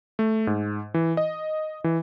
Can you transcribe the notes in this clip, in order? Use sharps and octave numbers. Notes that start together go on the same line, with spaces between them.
A3
G#2
E3
D#5
E3